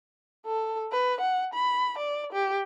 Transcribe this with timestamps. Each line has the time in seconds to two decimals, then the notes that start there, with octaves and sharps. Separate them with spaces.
0.46 A4
0.92 B4
1.21 F#5
1.54 B5
1.98 D5
2.33 G4